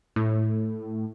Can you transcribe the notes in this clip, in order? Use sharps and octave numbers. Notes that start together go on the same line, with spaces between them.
A2